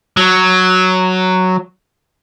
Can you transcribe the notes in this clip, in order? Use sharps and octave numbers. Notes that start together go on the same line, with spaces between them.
F#3